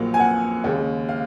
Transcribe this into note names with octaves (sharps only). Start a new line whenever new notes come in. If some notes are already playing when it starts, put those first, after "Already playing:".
Already playing: A#1 A#2 F#3 A#3
G#5
F#5
D#2 C#3 G#3
F5